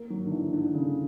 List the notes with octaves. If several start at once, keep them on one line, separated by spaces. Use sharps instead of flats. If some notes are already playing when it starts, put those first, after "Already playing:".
Already playing: A#3
F#3
D3
E3
D3
C#3